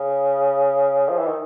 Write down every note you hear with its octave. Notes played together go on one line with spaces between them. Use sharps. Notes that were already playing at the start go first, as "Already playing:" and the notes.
Already playing: C#3
F3
E3
D#3